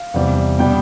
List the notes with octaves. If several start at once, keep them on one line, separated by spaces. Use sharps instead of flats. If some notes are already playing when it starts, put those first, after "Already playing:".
Already playing: F5
E2 C3 G3
B2 G3 B3 G5